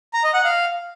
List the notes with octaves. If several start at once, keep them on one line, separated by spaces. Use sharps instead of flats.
A#5
D#5
F#5
F5